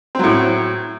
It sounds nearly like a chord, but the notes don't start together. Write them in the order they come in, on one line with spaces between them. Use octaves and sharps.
C4 F#3 A2